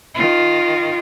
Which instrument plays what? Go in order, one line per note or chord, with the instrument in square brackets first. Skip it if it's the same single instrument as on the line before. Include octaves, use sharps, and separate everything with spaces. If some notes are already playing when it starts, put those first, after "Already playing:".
[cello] D#3 F4